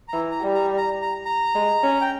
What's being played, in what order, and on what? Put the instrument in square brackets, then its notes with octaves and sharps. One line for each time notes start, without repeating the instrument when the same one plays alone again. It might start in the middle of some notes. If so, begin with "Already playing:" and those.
[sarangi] E3 [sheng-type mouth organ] A#5
[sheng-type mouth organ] A#5
[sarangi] G3
[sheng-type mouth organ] A#5
A#5
A#5
A#5
[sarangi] G#3
C#4
[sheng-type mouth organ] G5